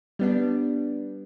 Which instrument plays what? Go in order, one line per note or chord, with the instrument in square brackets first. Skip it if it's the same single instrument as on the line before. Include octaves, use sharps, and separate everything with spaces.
[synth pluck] G3 B3 D4